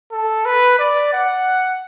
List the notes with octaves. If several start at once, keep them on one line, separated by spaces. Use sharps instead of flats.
A4
B4
D5
F#5